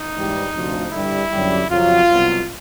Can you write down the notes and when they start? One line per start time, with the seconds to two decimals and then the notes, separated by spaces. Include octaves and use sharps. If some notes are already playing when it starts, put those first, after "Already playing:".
Already playing: D#4
0.16 G#2 E3 G3
0.54 D2 C3 F3
0.92 G2 D3 G3 E4
1.31 F#2 D3 G3
1.70 F2 C#3 F#3 F4
2.09 C2 B2 F#3